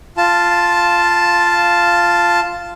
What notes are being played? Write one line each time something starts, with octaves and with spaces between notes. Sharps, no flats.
F4 A5